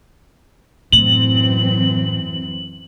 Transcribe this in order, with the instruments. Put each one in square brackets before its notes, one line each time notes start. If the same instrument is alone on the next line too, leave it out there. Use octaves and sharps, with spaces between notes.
[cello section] F#2 E3 C4 [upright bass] A2 [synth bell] F#7